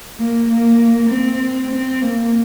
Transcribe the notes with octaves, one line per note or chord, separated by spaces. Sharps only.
A#3
A#3
C4
C4
A#3